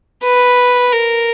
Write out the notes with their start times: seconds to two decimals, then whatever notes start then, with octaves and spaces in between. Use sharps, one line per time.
0.23 B4
0.93 A#4